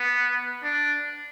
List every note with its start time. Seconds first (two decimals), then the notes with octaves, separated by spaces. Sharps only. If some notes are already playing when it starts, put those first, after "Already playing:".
Already playing: B3
0.63 D4